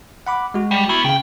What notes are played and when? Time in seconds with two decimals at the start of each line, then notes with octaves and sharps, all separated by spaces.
0.27 F#5 B5 D6
0.54 G#3 F#4
0.71 G3
0.89 B3 E4 C#6
1.05 C#3 F5 G5